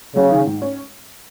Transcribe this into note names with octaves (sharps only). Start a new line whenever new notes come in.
C#3 F#3
D#3
G#2
C#4